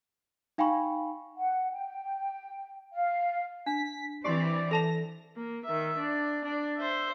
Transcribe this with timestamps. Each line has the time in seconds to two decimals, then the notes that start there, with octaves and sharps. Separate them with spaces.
0.58 D#4 F5 G5 G#5 B5 C#6
1.37 F#5
1.72 G5
2.93 F5
3.66 D4 B6
4.24 E3 C4 G4 D5 C6
4.71 A4 A5 A#6 F7
5.36 A#3
5.65 D#3 E5
5.98 D4
6.45 D4
6.76 C5 E5